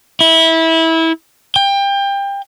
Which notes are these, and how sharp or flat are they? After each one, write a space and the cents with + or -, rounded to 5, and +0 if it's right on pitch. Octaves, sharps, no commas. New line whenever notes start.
E4 -20
G5 +25